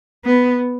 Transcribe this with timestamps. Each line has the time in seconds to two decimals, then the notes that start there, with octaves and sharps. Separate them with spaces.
0.25 B3